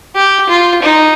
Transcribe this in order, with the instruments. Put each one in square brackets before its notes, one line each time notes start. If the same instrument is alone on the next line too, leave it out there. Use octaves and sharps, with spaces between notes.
[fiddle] G4
F4
D#4